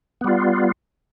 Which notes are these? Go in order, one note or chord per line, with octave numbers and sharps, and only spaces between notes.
G3 B3 F4